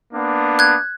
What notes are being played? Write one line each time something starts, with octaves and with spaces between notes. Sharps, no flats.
A#3 B3 D4
F#6 G#6